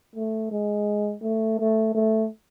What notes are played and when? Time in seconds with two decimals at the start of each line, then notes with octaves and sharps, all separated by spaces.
0.15 A3
0.51 G#3
1.23 A3
1.59 A3
1.95 A3